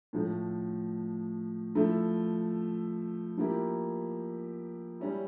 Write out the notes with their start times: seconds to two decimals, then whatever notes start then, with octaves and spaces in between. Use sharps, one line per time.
0.13 A2 F3 A3
1.75 F3 A3 E4
3.37 F3 A#3 E4 G4
5.00 G3 C#4 E4